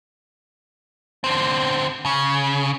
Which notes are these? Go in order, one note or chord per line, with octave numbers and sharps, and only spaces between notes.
D3 C4
C#3